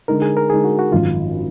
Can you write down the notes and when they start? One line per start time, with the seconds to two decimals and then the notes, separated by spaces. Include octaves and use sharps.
0.08 D3 G#3 D#4 A#4
0.22 G#4
0.37 A#4
0.50 D3 G#3 D#4 G#4
0.64 F#4
0.79 F#4
0.91 G#1 F#2 F3 F4